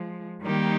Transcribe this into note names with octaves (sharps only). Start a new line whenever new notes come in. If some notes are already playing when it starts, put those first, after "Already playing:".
Already playing: F3 G#3
D#3 G3 A#3 D#4 G4